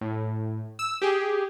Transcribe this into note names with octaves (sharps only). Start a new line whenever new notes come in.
A2
E6
G4 G#4